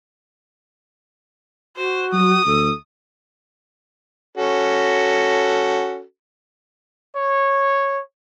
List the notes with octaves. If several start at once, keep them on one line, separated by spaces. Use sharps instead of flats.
F#4 C5
F#3 D#6
D2 A4
C#4 F#4 A4
C#5